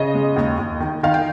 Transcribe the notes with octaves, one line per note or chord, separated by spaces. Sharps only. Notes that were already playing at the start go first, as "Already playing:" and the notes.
Already playing: C#3 D#5
G#3
D#2
D#2
D#3
D#3 F5
G5